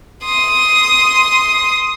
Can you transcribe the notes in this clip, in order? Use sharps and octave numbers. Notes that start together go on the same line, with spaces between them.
C6 D#6